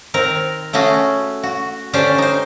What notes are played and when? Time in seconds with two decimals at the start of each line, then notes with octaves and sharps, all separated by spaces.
0.14 D#3 C4 A#4
0.73 A3 C#4 F#4 G#4
1.43 F#4
1.93 D3 C#4 D4 G4 C5
2.18 D#4 C5